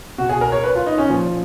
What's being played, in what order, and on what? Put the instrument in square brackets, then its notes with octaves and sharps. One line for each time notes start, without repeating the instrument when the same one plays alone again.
[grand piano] B2 F#4
G#4
A#4
C#5
B4
F4
D#4
C#4
A#2 F3